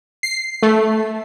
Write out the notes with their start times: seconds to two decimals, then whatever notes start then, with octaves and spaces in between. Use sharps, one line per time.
0.23 C7
0.62 A3